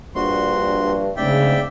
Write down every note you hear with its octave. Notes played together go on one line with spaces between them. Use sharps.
A#1 G2 F#4 C6
D1 G#2 C#3 D5 E5 G5